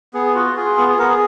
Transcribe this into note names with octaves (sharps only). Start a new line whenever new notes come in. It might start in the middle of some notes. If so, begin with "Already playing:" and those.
B3 G#4
F4 F#4
F4 G#4
B3
G#4
B3 A#4
G#4